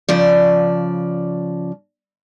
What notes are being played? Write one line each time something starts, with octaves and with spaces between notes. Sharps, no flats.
C#3 F3 D5